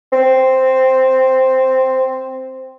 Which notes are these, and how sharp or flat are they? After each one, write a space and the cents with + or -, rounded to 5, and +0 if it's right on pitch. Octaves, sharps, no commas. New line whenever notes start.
C4 +0